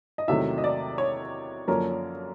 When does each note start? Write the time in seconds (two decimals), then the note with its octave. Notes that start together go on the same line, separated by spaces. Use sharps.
0.18 D#5
0.28 E2 C3 D#3 F#3 A3 E5
0.58 D#5
0.64 D5
0.98 C#5
1.68 F#2 D3 F3 A#3 C#4 A#4